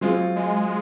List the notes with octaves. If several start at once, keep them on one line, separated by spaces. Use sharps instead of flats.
F#3 G#3 C4 F4
G#3